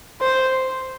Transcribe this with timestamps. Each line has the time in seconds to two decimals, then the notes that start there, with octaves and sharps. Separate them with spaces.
0.21 C5